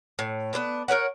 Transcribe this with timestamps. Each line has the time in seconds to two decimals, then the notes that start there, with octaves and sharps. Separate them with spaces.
0.19 A2
0.53 B3 C4 D4 A5
0.88 A#4 B4 C#5 F#5